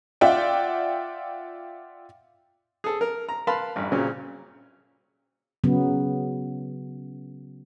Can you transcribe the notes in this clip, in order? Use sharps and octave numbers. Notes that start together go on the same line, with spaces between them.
F4 D5 E5 F#5 G5
G#4 A4
A#4
A#5
A#4 B4 F5 A5 B5 C6
A1 G2
A#2 C#3 F#3 C4 C#4
C#3 F#3 B3